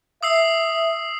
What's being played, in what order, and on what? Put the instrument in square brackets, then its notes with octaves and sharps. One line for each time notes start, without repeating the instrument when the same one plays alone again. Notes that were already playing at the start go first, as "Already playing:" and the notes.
[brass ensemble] E5 [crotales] D#6 E6 C7